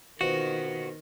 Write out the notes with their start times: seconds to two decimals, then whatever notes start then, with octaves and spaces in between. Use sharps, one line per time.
0.21 B2 D#3 C4 F4 F#4